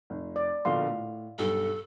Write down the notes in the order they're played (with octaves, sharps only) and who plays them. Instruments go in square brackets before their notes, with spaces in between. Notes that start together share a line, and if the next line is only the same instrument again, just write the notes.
[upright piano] F1
[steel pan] D5
[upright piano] A#1 B2 D3 [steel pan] F5 C6
[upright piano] A2
[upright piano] B1 G2 [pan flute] A4